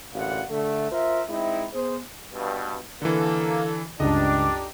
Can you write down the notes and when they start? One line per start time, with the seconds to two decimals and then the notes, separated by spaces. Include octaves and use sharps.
0.14 A1 D2 A#2 F5 F#5
0.50 D3 A3
0.91 F4 A#4 C5 E5
1.29 G#3 C4 D#4 E4
1.73 B3 G#4 C5
2.34 G2 B2
3.02 D3 E3 A#3 A4
4.00 C#2 G2 D3 D4 D#4 G4 D#5